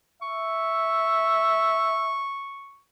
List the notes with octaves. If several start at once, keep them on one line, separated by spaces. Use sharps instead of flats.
E5 C#6